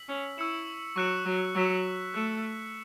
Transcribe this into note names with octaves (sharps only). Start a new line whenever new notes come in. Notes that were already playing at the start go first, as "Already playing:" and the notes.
Already playing: E6 B6 F#7
C#4
E4 C#6 E6 C#7 E7
F#3 C#6 F#6 C#7 E7
F#3
F#3 C#6 E6 B6 E7
A3 C#6 F#6 C#7 E7